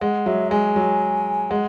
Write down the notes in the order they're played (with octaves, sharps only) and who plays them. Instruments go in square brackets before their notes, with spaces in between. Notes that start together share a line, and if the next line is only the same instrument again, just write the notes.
[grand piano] G#3 [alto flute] F#5
[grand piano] F#3 [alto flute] E5
[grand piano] G#3 [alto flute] G#5
[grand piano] F#3
[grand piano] G#3 [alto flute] F#5